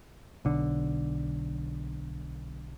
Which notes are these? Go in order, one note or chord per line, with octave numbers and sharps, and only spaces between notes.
B1 D3